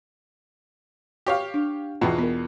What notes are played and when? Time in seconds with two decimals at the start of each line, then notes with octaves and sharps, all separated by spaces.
1.26 G4 C#5 F5
1.54 D4
2.01 E2 B2 F4 G5
2.19 B3 A#4